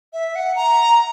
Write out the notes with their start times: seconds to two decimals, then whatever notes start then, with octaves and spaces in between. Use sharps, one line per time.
0.13 E5
0.35 F#5
0.56 A#5